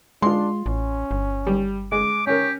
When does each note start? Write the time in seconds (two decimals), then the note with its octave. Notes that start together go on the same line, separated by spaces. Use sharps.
0.22 G#3 D4 F4 C6
0.66 A1 C#4
1.11 G1
1.47 G3
1.92 G#3 D6
2.27 C#4 G4 A#4 C#5